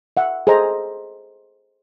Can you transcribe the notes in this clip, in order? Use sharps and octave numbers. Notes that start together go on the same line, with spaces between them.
E5 F#5
G#4 A4 C5 D#5 A#5